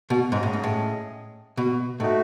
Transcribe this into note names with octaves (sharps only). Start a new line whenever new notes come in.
B2
G#2 C#4 G#4 D#5
A2
G#2
A2
B2
A2 A3 D#4 F#4